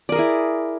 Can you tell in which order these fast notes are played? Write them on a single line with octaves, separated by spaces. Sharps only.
D5 A#4 G#4 E4